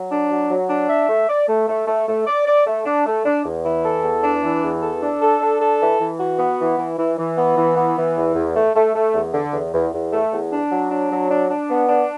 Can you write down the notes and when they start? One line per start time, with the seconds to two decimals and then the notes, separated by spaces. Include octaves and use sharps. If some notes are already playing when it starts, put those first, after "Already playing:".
Already playing: F#3
0.12 D4
0.31 F#3
0.50 F#3
0.69 D4
0.89 E5
1.09 A3
1.29 D5
1.48 A3
1.68 A3
1.87 A3
2.08 A3
2.27 D5
2.47 D5
2.67 A3
2.85 D4
3.06 A3
3.25 D4
3.45 E2
3.65 E3
3.84 A4
4.03 E2
4.23 D4
4.43 E3
4.63 E2
4.82 A4
5.02 D4
5.22 A4
5.41 D4
5.61 A4
5.80 E3
6.00 E3
6.20 F#4
6.39 B3
6.60 E3
6.79 E3
6.99 E3
7.18 E3
7.38 B3
7.57 E3
7.77 B3
7.97 E3
8.16 E2
8.35 E2
8.56 A3
8.76 A3
8.95 A3
9.14 E2
9.33 D3
9.53 E2
9.74 E2
9.93 E2
10.13 A3
10.32 E2
10.52 D4
10.72 F#3
10.91 D4
11.11 F#3
11.30 D4
11.50 D4
11.70 B3
11.89 D4